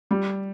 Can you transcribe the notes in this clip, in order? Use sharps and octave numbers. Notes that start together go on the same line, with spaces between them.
G3